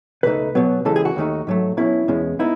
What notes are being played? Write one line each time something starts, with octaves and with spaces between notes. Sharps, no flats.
C#2 B2 A3 D#4 B4
B1 B2 F#3 B3
C#2 C#3 E3 G#3 A4
G#4
F#4
D#2 D#3 A3 D#4
G#2 F#3 A3
B1 B2 F#3 C#4 E4
E2 B2 G#3 C#4
B3 D#4 E4